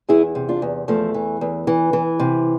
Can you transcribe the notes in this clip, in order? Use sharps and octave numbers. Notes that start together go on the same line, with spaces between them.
E2 E4 G#4
C3
D4 F4
E2
E2 F3 A3
E3
E2
E3
E3
C3